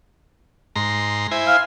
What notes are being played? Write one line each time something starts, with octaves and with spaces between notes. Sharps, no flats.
G#2 A#5 C6
E4 C5 G#5
F5 F6